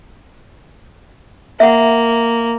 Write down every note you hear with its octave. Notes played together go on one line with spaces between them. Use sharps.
A#3 E5 F#5